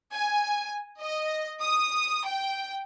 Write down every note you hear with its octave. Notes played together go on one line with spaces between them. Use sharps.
G#5
D#5
D#6
G5